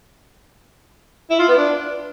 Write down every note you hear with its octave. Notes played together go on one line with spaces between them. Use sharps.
E4
F4
B3
D4